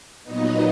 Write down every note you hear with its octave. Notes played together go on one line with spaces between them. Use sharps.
A#2 F#3 B3 D#4 D#5